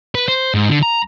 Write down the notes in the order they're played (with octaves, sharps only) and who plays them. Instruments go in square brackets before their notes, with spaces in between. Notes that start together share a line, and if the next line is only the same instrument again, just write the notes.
[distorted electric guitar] B4
C5
G#2
D3
A#5